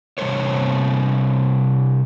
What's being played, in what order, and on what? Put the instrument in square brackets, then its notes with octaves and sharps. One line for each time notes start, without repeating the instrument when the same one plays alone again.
[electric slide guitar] C3 G3 A#3 A4 C5 C#5